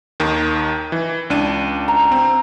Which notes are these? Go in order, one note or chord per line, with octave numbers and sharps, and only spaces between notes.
D#2 D#3
E3
C#2 D4 D#7
A#5
C4